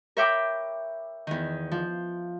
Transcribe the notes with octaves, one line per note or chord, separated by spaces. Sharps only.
A#4 C#5 E5 G5 B5 D6
E2 D#3
F3